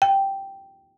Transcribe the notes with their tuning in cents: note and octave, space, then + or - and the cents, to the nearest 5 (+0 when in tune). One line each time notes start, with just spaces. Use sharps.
G5 -5